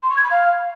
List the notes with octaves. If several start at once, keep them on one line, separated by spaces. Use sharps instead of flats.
C6
C#6
G#6
B5
F5